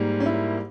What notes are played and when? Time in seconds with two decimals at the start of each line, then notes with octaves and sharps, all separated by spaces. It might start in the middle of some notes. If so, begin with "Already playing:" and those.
Already playing: G#2 G3 A#3
0.20 C#4
0.26 E4